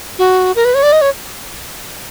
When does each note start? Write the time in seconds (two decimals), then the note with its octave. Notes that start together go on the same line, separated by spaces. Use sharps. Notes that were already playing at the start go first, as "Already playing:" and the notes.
0.19 F#4
0.56 A#4
0.65 B4
0.74 C#5
0.83 D5
0.92 D#5
1.01 C#5